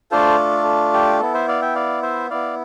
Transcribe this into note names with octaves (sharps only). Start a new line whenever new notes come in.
A3 D4 F4 A4 C5
A4
G4
B3 E4 A4
C5 E5
D5 F5
E5 G5
D5 F5
C5 E5
B3 E4 D5 F5